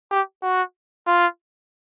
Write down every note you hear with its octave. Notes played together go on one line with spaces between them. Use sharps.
G4
F#4
F4